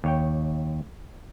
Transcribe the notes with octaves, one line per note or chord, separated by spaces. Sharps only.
D#2 C#5 G5